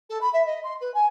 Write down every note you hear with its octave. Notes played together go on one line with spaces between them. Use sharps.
A4
B5
E5
D#5
C6
B4
G#5